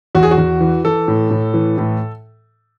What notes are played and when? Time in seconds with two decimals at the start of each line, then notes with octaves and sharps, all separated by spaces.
0.15 E2 F#4
0.23 G#4
0.31 F#4
0.38 E2
0.61 E3
0.85 E3 A4
1.08 A2
1.31 A2
1.54 E3
1.78 A2